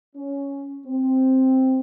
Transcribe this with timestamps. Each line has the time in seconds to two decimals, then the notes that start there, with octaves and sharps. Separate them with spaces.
0.16 C#4
0.87 C4